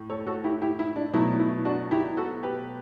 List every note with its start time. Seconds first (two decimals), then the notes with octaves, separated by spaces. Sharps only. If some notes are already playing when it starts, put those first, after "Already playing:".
Already playing: A2
0.10 A4 C#5
0.26 F#4 A4
0.44 E4 G4
0.62 E4 G4
0.79 E4
0.96 D4
1.13 B2 F#3 A3 E4
1.39 E4
1.65 D4 F#4
1.91 E4 G4
2.17 F#4 A4
2.43 G4 B4